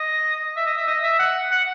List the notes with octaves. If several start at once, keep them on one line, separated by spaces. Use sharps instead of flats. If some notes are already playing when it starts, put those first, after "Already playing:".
Already playing: D#5
E5
D#5
E5
D#5
E5
F#5
F#5